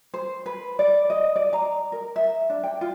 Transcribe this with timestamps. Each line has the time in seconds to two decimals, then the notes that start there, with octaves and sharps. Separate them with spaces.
0.14 C5
0.46 B4
0.79 D5
1.10 D#5
1.36 D5
1.53 A#5
1.92 A#4
2.16 E5
2.50 D4
2.63 G5
2.81 F4